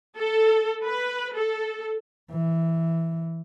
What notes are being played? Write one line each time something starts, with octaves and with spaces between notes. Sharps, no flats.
A4
B4
A4
E3